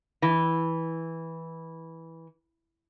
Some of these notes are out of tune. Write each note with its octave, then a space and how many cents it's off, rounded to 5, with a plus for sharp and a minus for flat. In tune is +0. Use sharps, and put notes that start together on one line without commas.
E3 -10